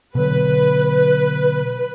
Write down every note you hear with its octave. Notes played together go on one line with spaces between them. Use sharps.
B2 D3 F#3 B4